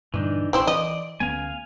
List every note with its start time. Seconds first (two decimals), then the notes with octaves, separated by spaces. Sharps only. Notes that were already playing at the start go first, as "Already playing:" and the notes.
0.14 G2 A#2 D3 E3 D4 D#4
0.53 A#1 C4 E4 C5 D5
0.67 E3 D#5
1.20 D2 B3 C#4 F5 G#5